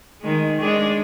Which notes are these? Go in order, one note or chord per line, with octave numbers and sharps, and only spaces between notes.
D#3 G#3
G#3 D4 G#4